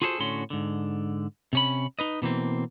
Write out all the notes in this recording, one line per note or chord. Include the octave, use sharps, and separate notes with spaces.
F4 F#4 G#4 A4 B4 C5
A2 D3 C#4 F#4 C6
G#2 D3
C3 C#4 B5
D#4 B4 D#5
B2 E3 A#3 C4